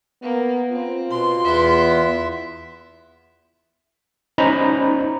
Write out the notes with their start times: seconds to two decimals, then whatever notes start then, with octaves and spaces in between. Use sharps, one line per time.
0.22 A#3 B3
0.72 C4 F4
1.11 B2 C6
1.44 E2 B3 E4 E5
4.38 C#4 D#4 C5 A#5 B5